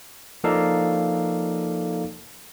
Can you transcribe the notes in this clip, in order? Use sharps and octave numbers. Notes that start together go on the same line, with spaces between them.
F3 A#3 D#4 A4 D5 F5